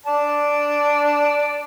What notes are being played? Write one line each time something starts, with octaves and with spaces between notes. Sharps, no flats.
D5 A5